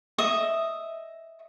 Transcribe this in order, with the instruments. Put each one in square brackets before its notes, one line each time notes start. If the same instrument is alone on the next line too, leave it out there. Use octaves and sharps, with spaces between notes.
[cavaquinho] D#5 E5 D#6